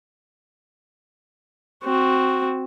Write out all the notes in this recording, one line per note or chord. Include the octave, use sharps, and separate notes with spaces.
C4 F#4